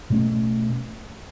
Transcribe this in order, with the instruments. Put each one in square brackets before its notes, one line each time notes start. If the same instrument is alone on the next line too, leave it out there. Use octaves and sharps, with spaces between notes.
[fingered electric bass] B2 A3 C#4